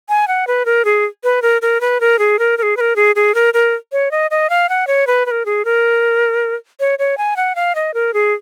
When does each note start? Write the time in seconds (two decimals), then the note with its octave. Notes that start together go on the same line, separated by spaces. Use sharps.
0.09 G#5
0.28 F#5
0.47 B4
0.66 A#4
0.85 G#4
1.24 B4
1.42 A#4
1.62 A#4
1.81 B4
2.00 A#4
2.19 G#4
2.39 A#4
2.58 A#4
2.63 G#4
2.77 B4
2.81 A#4
2.96 G#4
3.16 G#4
3.35 A#4
3.54 A#4
3.92 C#5
4.11 D#5
4.31 D#5
4.50 F5
4.69 F#5
4.87 C#5
5.07 B4
5.26 B4
5.31 A#4
5.46 G#4
5.65 A#4
6.80 C#5
6.99 C#5
7.18 G#5
7.36 F#5
7.55 F5
7.75 D#5
7.94 A#4
8.14 G#4